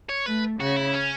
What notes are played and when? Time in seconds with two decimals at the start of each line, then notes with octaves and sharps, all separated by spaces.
0.09 C#5
0.26 A3 B4
0.59 C#3 F#4
0.76 E4
0.93 C#4